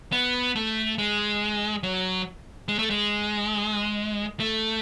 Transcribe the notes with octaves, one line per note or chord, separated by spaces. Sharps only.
B3
A3
G#3
F#3
G#3
A3
G#3
A3